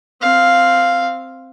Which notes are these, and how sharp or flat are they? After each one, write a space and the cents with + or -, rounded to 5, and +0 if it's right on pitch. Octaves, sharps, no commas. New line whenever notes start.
C4 +0 F5 +0